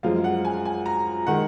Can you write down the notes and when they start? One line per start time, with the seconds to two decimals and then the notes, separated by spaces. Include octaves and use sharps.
0.03 F#2 F3 G#3 F5
0.24 F#5
0.45 G#5
0.65 G#5
0.86 A#5
1.27 D#3 G#3 F#5